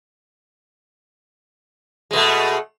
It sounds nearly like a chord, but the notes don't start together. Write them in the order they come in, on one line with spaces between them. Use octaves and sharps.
G#3 B2 A3